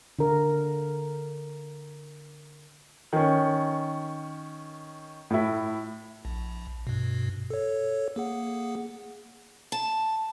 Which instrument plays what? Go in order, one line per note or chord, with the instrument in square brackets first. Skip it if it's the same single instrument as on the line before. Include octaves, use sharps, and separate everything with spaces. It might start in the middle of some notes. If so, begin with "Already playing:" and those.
[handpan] D3 A#4
[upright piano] D#3 C#4
A2 E4
[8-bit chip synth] A#1
G2 B2
A4 C#5
A#3 G#4 F#5
[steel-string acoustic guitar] A5